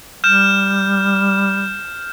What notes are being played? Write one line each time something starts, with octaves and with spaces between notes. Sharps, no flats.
G3 F6 G6 E7